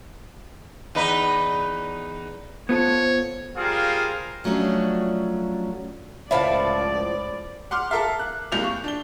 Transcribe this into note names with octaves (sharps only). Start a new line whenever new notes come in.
E2 D#4 B4
B3 F4 A4 C5 C#5
G3 F4 G#4 A#4 C5 F5
F3 F#3 A3 C#4 D4
C#2 A2 F3 D5 E5 F5
F#5 C6 D6 F6
A4 A#4 E5 F5
F#6
C2 A#3 G6 F7
C#6
D4 G7